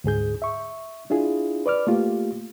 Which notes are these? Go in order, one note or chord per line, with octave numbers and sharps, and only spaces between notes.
D2 G#2 G#4 G6
E5 C#6
D4 E4 F4 G#4
B4 D5 D6 F6
A3 A#3 F4 G4